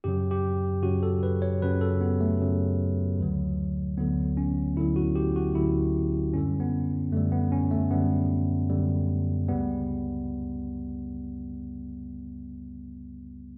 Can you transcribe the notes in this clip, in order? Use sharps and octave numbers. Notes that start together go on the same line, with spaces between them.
F#2 C#3 F#3 G4
G4
F#2 C#3 F#3 F#4
A4
B4
C#5
F#2 C#3 F#3 B4
A4
B3
A3
F#2 C#3 F#3
D2 D3 F#3
D2 D3 F#3 B3
C#4
D2 D3 F#3 E4
F#4
G4
F#4
D2 D3 F#3 E4
F#2 D3 G3 C#4
B3
F#2 D3 G3 A3
B3
C#4
A3
F#2 D3 G3 B3
F#2 D3 G3
C#2 C#3 G3 B3